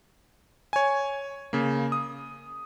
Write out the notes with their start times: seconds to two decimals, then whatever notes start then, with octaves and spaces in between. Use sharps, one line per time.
0.73 C#5 G#5
1.53 C#3 A#3
1.92 D#6